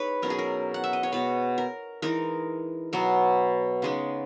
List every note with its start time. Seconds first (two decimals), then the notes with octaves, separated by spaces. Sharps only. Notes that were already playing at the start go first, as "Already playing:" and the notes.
Already playing: G#3 D#4 B4 C#5
0.22 B2 F#3 C#4 A#4
0.30 G#4
0.39 A#4
0.74 F#5
0.84 E5
0.93 D#5
1.03 C#5
1.12 B2 G#3 B3 B4
1.58 A#4
2.02 E3 G#3 D#4 A#4
2.93 B2 F#3 B3
3.82 C#3 G#3 B3 D#4